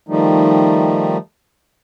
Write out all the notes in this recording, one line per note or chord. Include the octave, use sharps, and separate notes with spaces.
D#3 F3 G3 A3 D#4